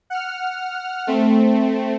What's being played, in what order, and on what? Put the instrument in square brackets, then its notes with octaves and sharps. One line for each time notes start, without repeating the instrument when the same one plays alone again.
[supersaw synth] F#5 F6
A3 C4